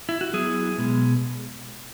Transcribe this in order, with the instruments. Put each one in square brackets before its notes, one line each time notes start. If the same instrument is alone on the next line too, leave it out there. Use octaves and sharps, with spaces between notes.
[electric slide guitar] E4
F#4
F#3 B3 E4 G#4
B2 G#3 B3